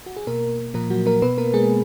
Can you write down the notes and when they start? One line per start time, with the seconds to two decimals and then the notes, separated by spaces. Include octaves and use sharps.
0.06 F#4
0.16 G#4
0.27 B2 A#3 A#4
0.74 A#2 F3 A#3 A#4
0.90 F#3 F#4
1.06 A#3 A#4
1.22 B2 B3 B4
1.38 A#3 A#4
1.53 G#3 G#4